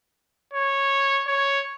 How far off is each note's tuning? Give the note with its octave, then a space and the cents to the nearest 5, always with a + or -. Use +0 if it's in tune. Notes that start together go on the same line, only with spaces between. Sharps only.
C#5 -10
C#5 +0